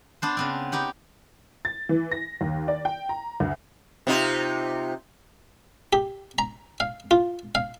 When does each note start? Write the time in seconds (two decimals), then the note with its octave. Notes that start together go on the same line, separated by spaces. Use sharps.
0.22 B3 D4 C5
0.37 C#3 B3 C4
0.72 B3 D#4 G4 F#5
1.65 A6
1.89 E3
2.12 A#6
2.41 D#2
2.68 D5
2.85 G5
3.09 A#5
3.40 D2
4.07 C3 D#4 F4
5.93 G4
6.38 A#5
6.80 F5
7.11 F4
7.55 F5